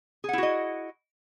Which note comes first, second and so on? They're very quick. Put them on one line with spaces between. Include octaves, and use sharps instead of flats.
G#4 F#5 E4 F#4 D#5